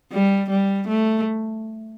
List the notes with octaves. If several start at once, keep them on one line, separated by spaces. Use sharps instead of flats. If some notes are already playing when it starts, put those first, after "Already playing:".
G3
G3
A3